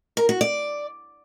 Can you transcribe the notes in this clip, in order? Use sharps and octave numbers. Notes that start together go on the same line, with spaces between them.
A#4
F#4
D5